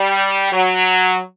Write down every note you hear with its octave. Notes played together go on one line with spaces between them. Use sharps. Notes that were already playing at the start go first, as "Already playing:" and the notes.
Already playing: G3
F#3